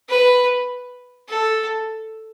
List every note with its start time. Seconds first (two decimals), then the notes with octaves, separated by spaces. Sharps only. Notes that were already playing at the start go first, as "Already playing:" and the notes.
0.09 B4
1.29 A4